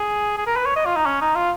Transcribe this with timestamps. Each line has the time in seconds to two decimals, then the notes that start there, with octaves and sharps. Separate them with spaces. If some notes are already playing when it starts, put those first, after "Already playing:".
Already playing: G#4
0.37 G#4
0.46 A#4
0.56 B4
0.65 C#5
0.76 D#5
0.85 F4
0.96 D#4
1.06 C#4
1.21 D#4
1.35 F4